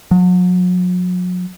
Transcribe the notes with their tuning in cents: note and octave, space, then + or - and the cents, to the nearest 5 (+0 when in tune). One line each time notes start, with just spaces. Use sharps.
F#3 -40